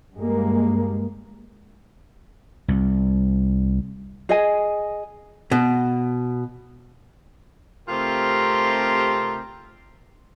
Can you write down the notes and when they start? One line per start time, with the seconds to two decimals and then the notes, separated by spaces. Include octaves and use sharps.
0.15 G2 G#3 A#3
2.68 C2
4.29 G#4 D#5 G#5
5.51 B2
7.89 C3 A3 C4 F4 G4 A#4